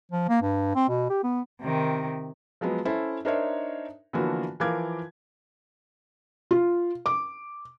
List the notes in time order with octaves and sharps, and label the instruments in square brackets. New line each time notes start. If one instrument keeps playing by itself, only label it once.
[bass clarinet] F3
A#3
G2
C4
B2
G4
B3
[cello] C3 D#3
[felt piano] F3 F#3 G#3 B3
C#4 E4 A4 C5
D4 D#4 A#4 C5 C#5 E5
D3 E3 F3 A#3 B3 F#4
E3 F3 A#4 F5 D6 G#6
F4
D6